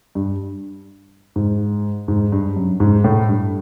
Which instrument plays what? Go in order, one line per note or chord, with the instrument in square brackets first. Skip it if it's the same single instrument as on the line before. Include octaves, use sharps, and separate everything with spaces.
[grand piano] G2
G#2
G#2
G2
F#2
G#2
A2
G2